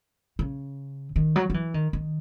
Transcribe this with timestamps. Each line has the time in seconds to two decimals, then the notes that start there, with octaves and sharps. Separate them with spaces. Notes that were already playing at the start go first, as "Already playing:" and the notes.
0.39 C#3
1.16 D#3
1.36 F#3
1.50 F#3
1.54 E3
1.74 D#3
1.93 D#3